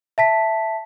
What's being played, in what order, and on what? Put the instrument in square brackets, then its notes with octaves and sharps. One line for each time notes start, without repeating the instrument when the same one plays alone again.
[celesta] E5 A5 B6